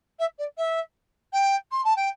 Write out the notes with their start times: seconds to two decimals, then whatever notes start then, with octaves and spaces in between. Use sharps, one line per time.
0.19 E5
0.38 D5
0.57 E5
1.32 G5
1.71 C6
1.84 A5
1.96 G5